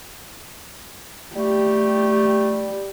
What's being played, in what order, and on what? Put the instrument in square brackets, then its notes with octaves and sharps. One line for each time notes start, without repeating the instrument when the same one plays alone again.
[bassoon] G3 [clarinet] A3 [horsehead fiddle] G4